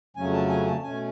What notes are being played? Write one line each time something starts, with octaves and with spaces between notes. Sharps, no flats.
F2 C#3 F#3 A3 C#4 G#5
A5
G#5
A5
B2 A3 C#4 G#5